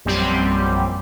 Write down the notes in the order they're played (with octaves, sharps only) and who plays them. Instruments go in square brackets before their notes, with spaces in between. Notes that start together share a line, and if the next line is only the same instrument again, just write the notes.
[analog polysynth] A#1 F#2 G3 C4 G4